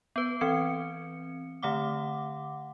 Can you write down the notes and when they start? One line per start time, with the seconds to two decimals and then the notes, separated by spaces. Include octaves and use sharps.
0.16 B3 B4
0.41 E3 C4 C#7
1.63 D3 A3 F#5 D6